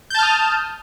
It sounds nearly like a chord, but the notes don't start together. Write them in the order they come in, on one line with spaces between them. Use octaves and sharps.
G6 A5 F6 D#6